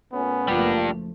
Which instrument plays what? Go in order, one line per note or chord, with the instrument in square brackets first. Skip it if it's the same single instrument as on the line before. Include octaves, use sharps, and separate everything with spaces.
[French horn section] A#2 A3 C#4 [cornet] B3
[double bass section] F#1 F3 A3 [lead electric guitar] G3 D4 [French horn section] A#3 F4